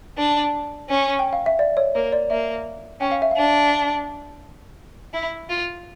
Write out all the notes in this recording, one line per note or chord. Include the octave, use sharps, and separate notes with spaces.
D4
C#4
G5
F5
E5
D5
C#5
A#3 C#5
D5
A#3 E5
C#4 G5
F5
E5
D4 F5
E4
F4